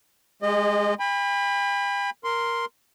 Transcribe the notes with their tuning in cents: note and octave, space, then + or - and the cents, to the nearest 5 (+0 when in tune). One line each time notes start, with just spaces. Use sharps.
G#3 +0 G4 +45 D#5 -25
G5 +45 B5 +0
A#4 +0 C6 +0